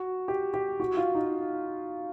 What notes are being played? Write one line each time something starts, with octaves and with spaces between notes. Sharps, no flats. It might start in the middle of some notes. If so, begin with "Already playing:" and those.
Already playing: F#4
G4
G4
F#4
F4
D#4